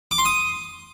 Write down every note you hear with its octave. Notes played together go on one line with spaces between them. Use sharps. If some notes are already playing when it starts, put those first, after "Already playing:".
D6
C6
D#6